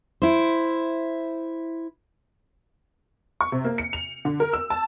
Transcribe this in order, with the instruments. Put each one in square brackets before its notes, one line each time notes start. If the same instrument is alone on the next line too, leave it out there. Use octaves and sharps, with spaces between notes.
[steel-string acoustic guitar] E4 C5
[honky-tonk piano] C#6
C3
A#3
C#7
F7
D3
A#4
E6
A5